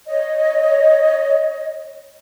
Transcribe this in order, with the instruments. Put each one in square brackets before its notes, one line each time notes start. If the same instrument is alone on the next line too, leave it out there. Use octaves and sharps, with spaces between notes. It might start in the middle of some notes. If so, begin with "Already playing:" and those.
[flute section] C#5 D#5